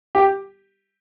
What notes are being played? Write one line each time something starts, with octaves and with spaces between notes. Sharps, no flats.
G4